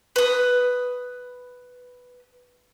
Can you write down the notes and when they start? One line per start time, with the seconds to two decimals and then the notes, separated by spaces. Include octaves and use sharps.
0.16 B4 D#6